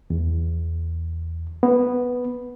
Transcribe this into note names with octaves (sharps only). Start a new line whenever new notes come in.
E2
B3